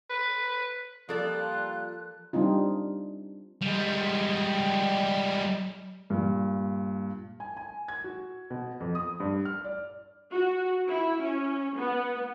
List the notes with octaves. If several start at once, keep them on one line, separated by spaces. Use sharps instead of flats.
B4
F3 G3 A#3 F4 A4 D5 F#6
G3 C4 D4 D#4 F4
G3 G#3
G2 A#2
G#5
G#5
G#6
F#4
B2
F2
D#6
G2
F6
D5
F#4
E4
C#4
B3